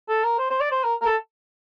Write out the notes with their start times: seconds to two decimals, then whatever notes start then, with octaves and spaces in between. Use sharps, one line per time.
0.09 A4
0.24 A#4
0.39 C5
0.50 C5
0.61 D5
0.72 C5
0.84 A#4
1.02 A#4
1.05 A4